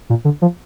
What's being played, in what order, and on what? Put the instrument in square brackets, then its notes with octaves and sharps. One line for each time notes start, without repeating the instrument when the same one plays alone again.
[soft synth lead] A#2
D3
F3